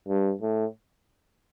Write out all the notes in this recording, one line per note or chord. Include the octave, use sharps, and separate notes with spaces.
G2
A2